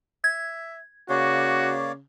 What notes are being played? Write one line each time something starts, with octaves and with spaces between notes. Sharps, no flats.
E5 G#6
C#3 A#3 F#4 C#5 D5